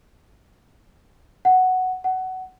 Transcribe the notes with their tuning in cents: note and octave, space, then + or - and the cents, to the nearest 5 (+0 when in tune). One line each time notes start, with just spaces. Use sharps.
F#5 +5
F#5 +15